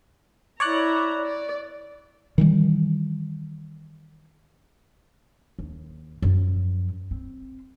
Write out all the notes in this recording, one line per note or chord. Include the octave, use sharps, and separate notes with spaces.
E4 C#5 D5 A#5 F#6
D5
D#3 E3 G3
D#2
F#2 F3
C4